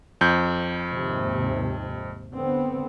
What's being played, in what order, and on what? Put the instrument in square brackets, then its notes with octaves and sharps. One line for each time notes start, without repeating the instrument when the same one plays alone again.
[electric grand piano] F2 G6
[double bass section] D#2 G#2 C3
D3 B3 C4